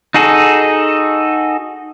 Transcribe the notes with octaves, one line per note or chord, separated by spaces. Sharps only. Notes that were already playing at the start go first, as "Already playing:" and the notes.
D#4 F#4 G#4 A4